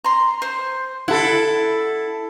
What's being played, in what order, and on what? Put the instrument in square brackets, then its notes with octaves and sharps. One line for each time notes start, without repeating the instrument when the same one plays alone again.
[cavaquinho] A#5 C6
C5
[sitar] E4 A4 [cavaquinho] F#5